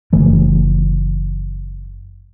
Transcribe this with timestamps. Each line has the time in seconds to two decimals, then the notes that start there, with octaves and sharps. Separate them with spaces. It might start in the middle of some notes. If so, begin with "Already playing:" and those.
0.13 F#1 E3 A3